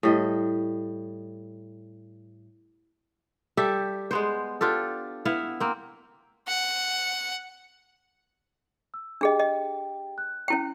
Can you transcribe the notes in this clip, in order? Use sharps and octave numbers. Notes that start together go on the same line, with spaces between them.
A2 G3 D#5
G3 G4 A4 E5
G#3 B3 C5
D4 F4 G4 A4
B3 E4 E5 F5
A#3 C4
F#5
E6
D4 G4 G#4 D#5 G5
D#5
F#6
C#4 E4 G5